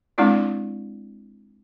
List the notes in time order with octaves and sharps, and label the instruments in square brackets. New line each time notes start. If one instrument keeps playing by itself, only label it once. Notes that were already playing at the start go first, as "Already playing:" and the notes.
[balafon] G#3 C4 D4 E4 D5